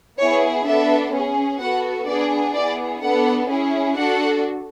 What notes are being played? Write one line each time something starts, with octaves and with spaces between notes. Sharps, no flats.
B3 E4 G#4 C#5
B3 D4 A4 E5
C#4 G#4
B3 F#4 A4 F#5
B3 D4 G#4 D5
B3 E4 G#4 D5
B3 D4 A4 F#5
C#4 E4 G#4
D4 F#4 A4 F#5